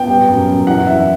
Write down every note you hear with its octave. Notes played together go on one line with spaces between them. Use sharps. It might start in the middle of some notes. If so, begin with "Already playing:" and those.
Already playing: B3 G5
G3
F#2
F#2
E3 F#5
E3 E5